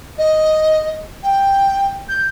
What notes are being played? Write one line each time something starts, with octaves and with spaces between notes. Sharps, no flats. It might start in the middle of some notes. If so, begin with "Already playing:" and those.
D#5
G5
G6